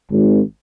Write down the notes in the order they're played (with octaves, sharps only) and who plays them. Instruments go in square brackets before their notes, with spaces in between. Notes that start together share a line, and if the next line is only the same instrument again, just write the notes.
[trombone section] G#1